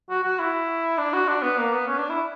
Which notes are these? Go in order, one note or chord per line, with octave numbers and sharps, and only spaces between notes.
F#4
F#4
E4
D4
F#4
D4
B3
A#3
B3
C#4
D4
E4